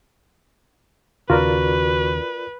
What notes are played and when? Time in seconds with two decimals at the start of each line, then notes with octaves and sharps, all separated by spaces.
1.30 D#2 C#3 F4 F#4 A#4 B4 D5